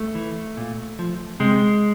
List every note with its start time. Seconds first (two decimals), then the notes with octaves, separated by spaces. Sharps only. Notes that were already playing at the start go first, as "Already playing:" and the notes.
Already playing: A3
0.15 E3
0.57 A#2
0.99 F3
1.40 C3 G#3